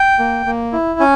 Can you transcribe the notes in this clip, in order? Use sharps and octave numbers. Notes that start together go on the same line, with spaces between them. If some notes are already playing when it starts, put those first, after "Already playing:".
Already playing: G5
A#3
A#3
E4
C#4 G#5